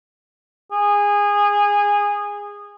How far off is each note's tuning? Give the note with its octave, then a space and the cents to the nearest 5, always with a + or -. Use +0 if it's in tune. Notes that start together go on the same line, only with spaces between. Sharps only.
G#4 -20